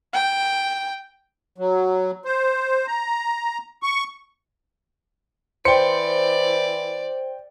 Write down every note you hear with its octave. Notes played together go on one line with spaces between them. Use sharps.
G5
F#3
C5
A#5
C#6
E3 C5 D5 G5 C#7